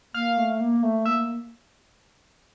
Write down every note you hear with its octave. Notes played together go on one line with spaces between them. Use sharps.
A#3 F5
A3
A#3
A3
A#3 E5